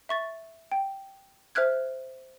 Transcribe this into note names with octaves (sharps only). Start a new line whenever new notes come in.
E5 C#6 A6
G5
C5 E5 F6 F#6 G#6